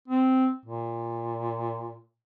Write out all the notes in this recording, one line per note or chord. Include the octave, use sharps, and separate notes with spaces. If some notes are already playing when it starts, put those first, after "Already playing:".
C4
A#2